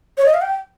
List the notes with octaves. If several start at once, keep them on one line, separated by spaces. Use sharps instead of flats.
C#5
D#5
F5
G5